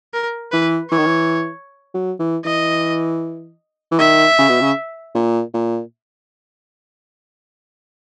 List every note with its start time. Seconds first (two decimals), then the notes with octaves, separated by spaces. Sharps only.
0.14 A#4
0.52 E3 B4
0.91 E3 C#5
0.98 D#3
1.06 E3
1.94 F#3
2.20 E3
2.45 E3 D#5
3.92 E3
3.99 D#3 E5
4.39 C#3
4.49 B2
4.61 C#3
5.15 A#2
5.54 A#2